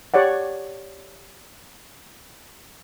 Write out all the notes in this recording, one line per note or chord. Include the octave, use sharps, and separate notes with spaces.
G4 C#5 D5 F#5